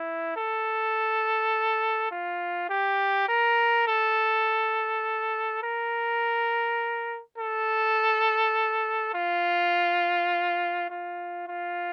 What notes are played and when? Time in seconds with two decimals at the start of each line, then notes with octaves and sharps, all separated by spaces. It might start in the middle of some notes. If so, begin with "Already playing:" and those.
Already playing: E4
0.36 A4
2.11 F4
2.70 G4
3.28 A#4
3.87 A4
5.62 A#4
7.38 A4
9.14 F4
10.90 F4
11.48 F4